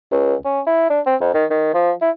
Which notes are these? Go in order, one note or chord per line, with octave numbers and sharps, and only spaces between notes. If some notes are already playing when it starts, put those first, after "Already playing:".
C#2
C#4
E4
D4
C4
F2
D#3
D#3
F3
E4